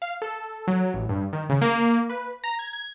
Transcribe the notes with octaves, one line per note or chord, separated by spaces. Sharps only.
F5
A4
F#3
A1
G2
D#3
C#3
A#3
B4
A#5
G#6
G#6